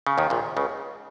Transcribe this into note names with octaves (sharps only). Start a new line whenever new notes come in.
C#3
D#2 D#3
A#1 A#2
C#2 C#3